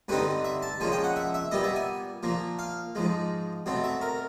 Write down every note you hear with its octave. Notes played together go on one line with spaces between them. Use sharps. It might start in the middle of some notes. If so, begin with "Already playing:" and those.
G2 D3 G3 C4 D#4 B4
E5
A5
A#2 F3 G#3 C#4 G#5
G5
F#5
E5
E5
A#2 G3 B3 D#5
E5
G#5
A#2 F3 A#3
F5
G#2 F3 G#3
B2 F#3 A3 C4
E5
A#4